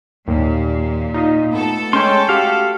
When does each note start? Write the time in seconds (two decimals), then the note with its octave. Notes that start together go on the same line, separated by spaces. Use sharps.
0.28 D#2 A#2
1.14 D#4 F4 D#5
1.53 A3 B3 A4
1.93 G#3 C#4 G5 C6
2.29 F#4 G4 F5